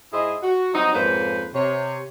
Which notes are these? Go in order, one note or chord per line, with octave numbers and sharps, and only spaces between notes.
G#2 E4 G#4 C5 D#5
F#4
F#3 G3 C4 D#4
F2 G#2 A#3 C#4 B4 C5
C3 C#5